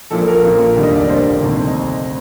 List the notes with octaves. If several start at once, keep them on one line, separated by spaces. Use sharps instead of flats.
A#1 A#2 F3 A#3 A4
A#4
A#1 A#2 F3 A#3
F1 D#2 D3 G3 A#3
D#5
D5
F1 D#2 D3 G3 A#3 C5
D2 C3 D#3 A3
D#5